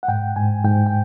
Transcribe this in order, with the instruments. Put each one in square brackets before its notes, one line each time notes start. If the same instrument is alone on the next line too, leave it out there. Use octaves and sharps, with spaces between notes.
[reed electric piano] F#5
G#2 G5
G#2 G#5
G#2 G5
G5